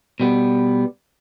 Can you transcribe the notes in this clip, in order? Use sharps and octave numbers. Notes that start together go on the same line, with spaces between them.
B2 G3 B3